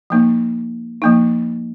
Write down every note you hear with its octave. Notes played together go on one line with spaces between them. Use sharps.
F3 A#3 D#4
F3 A#3 D#4